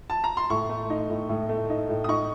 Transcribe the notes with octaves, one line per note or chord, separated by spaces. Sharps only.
A5
A#5
C6
A2 C#6
A3
D#4
A2
A2
A3
D#4
A2
D#6
D#4 C#6